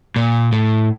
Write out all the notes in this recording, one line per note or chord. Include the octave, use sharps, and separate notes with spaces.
A#2
A2